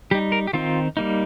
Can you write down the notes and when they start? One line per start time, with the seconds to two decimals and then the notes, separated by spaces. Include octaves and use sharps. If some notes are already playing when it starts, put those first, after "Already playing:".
0.11 G3 D#4 G4
0.32 A#4
0.47 G4
0.53 D#3 C4 D#4 F4
0.97 G3 A#3 D#4